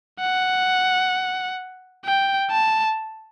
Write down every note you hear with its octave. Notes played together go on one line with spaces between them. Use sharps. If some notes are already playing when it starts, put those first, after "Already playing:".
F#5
G5
A5